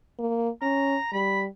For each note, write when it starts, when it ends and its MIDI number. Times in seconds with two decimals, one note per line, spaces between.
0.19 0.49 58
0.62 0.97 61
0.62 1.08 82
1.13 1.47 55
1.13 1.41 83